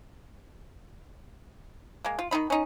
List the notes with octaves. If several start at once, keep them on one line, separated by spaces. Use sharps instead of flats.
G#3 A#3
F4
D#3 G3 D#4 B5
C#4 D#4